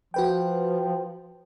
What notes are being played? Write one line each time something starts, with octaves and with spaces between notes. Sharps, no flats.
F3 F#4 B4 G5